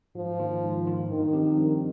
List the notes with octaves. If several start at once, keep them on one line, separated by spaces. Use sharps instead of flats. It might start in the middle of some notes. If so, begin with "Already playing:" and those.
G#2 F3
D#3 A#3 F4
G#2
D#3 A#3 F4
G2 D#3
F3 C4 G4
G2